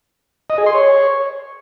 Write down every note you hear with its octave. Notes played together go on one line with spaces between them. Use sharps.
D#5
G#4
C6
C#5